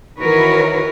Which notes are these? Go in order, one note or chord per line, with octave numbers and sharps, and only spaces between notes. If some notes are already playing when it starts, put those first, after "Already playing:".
D#3 E3 F#4 A#4 B4 C#5